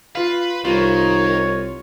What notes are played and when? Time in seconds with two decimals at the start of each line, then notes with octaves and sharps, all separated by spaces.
0.15 F4 B4 F5
0.65 C2 D#3 F4 C#5